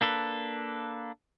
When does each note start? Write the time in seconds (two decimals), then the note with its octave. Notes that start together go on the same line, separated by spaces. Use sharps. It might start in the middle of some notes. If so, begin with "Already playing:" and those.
0.01 A#3 D4 A4 B4